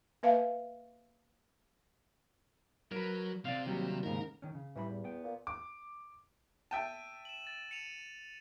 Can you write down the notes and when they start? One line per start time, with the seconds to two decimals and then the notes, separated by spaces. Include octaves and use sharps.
0.23 A#3 B4 E5 F5
2.92 F#3 A#4 B4
3.45 C3 D5 F5
3.66 D#2 F#3 G3
4.03 D#2 G#2 C#3 A#4
4.42 D#3 C#4
4.55 C#3
4.76 A2 E3 G3 B5
4.89 E2
5.04 B3 G5
5.24 A#2
5.47 D6
6.71 E5 G5 A5 D#7
7.25 E7 F#7
7.47 A6
7.71 C#7 D#7 F7